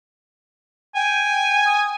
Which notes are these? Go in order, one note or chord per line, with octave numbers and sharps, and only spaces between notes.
G5 G#5
D#6